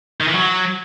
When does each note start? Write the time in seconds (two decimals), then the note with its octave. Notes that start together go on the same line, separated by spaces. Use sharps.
0.21 D#3
0.28 E3
0.35 F#3